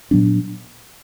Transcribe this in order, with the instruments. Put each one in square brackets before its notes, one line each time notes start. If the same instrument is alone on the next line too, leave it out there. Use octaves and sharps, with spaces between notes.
[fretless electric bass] A#2 F#3 B3 D4